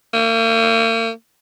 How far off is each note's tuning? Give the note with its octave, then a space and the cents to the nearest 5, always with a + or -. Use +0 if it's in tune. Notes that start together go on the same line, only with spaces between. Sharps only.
A#3 -45